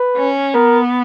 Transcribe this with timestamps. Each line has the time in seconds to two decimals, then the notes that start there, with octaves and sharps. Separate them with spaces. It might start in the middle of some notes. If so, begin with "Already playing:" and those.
Already playing: B4
0.17 C#4
0.54 B3 A#4